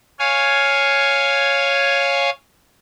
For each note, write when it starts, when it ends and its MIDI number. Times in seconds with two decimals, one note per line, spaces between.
0.19 2.30 73
0.19 2.30 77
0.19 2.30 80